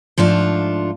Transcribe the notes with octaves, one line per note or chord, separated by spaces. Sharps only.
G#2 F3 A3 D4 F4